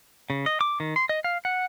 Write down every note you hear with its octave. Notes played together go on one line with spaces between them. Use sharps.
C#3
D#5
D6
D#3
C6
D#5
F5
F#5